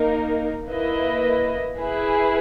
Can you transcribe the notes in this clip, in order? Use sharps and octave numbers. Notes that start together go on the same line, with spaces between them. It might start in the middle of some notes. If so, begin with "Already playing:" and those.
Already playing: A#3 D#4 A#4
A#3 E4 B4 D#5
E4 G#4 B4